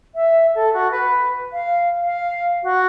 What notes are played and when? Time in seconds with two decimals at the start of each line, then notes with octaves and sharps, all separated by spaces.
0.15 E5
0.55 A4
0.73 F#4
0.91 B4
1.52 F5
2.03 F5
2.63 F#4